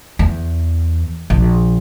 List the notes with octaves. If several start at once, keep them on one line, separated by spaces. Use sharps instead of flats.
E2
A#1